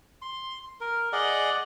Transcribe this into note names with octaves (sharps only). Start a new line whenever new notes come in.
C6
A#4
G#4 D5 D#5 F#5